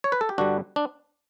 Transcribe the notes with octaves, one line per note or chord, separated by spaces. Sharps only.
C#5
B4
A4
G4
G2 D3 G3 D4 F#4
D4